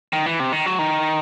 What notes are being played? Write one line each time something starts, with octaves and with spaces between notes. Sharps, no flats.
D#3
E3
C3
D#3
F#3
D#3